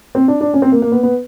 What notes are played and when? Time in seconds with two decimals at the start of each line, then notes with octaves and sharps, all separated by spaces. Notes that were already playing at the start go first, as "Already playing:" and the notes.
0.15 C4
0.28 D4
0.41 D4
0.54 C#4
0.62 C4
0.72 A#3
0.82 A#3
0.92 B3
1.03 B3